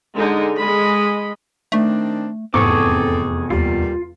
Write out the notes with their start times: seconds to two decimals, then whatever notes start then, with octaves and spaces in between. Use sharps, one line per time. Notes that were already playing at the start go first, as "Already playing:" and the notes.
0.13 D3 G#3 D#4
0.57 G#3 D#5 B5
1.72 D#3 A3 C4 D4
2.54 F1 E2 G#2 C4 G#4 A4 C#6 D6
3.50 D#2 A#2 G3 F4